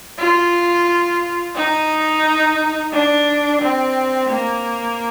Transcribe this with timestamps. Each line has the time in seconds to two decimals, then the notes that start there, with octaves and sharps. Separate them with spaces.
0.18 F4
1.56 D#4
2.93 D4
3.62 C4
4.30 A#3